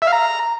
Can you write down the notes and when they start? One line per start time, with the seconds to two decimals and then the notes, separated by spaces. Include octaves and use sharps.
0.02 E5
0.07 F5
0.12 A#5